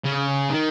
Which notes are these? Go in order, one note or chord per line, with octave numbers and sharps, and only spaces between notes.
C#3
D#3